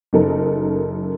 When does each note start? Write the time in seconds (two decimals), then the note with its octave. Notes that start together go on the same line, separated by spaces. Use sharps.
0.13 F#1 F#2 D#4 A4 A#4